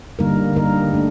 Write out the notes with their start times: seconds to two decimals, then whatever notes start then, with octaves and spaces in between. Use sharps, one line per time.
0.19 D3 G3 A#3 D#4 A#4
0.56 D3 G3 A#3 D#4 A#4
0.93 A3 D4